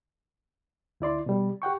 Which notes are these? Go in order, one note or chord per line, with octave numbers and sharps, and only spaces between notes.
D2 E4 D5 C6
B2 G3
G4 F#5 G5 C#6